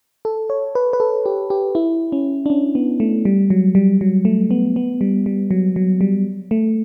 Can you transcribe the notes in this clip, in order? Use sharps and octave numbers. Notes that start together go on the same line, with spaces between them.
A4
C#5
B4
B4
A4
G4
G4
E4
C#4
D4
C#4
B3
A3
G3
F#3
G3
F#3
A3
B3
B3
G3
G3
F#3
F#3
G3
A3